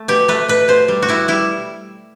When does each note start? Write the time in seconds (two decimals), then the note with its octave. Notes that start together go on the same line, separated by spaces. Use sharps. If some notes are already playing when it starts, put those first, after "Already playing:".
Already playing: A3
0.08 B2 G4
0.28 A3 B4
0.48 B2 B4
0.68 B2 C5
0.88 G3
1.02 F#4
1.08 G3 E4
1.28 G3 E4